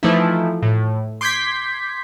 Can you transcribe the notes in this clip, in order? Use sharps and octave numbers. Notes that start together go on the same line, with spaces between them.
E3 F3 A3 D#4 E4
A2
C6 D6 G6 G#6 B6